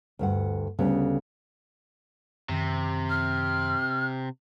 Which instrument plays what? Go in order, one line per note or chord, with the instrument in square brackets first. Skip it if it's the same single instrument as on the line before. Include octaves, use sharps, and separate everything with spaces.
[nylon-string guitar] D2 G2 F#5
D2 C#3 G3 B3
[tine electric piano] F#2 D#3 [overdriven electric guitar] C3
[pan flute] F6